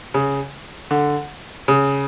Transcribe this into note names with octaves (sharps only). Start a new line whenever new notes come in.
C#3
D3
C#3